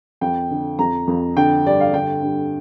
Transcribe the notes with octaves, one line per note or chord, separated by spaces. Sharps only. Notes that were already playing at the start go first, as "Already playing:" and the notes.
F2 G5
D3
F2 A#5
F2
D3 G5
G2 D5
F5
D3 G5
G2